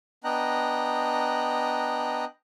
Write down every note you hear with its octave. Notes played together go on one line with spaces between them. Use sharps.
B3 D4 D#5 G5 A#5 F#6